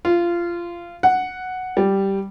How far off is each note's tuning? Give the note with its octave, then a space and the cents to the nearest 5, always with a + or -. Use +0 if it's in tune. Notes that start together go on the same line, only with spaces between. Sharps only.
F4 -20
F#5 +0
G3 -5